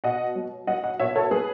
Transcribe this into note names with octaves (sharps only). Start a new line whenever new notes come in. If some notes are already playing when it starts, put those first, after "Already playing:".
B2 D#5 F#5
F#3
F#3 D#5 F#5
D#5 F#5
B2 C#5 E5
A4 C#5
F#3 G#4 B4